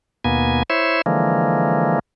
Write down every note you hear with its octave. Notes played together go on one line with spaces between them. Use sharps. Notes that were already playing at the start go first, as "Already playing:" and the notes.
D#2 B2 A#3 B3 G#5
E4 C5 C#5 E5
D3 E3 F3 G#3 A#3